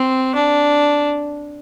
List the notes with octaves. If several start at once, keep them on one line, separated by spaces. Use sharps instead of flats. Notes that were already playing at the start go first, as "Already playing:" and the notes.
Already playing: C4
D4